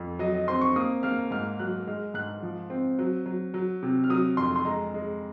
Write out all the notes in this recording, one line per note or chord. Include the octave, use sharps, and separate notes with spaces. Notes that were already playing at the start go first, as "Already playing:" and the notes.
Already playing: F2
F#3 D#5
D#5
C4 C6
C#6
A#3 D#6
A#3 F6
G#2 F6
F#3 F#6
G#3 F6
G#2 F#6
F3
C4
F#3
F#3
F#3
C3
F6
F#3 D#6
F2 C6
C6
G#3 A#5
G#3